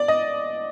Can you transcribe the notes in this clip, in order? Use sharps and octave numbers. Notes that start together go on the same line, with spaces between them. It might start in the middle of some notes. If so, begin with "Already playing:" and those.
Already playing: D5
D#5